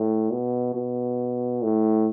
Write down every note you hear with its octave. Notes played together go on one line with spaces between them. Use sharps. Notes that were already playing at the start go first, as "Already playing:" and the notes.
Already playing: A2
B2
B2
A2